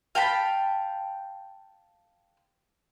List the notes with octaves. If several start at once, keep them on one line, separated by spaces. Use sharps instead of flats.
F5 G5 A5 B5